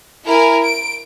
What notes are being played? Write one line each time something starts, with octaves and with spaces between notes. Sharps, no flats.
E4 A#4 G#5
D7